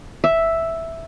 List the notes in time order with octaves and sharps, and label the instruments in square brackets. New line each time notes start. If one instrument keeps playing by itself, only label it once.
[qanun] E5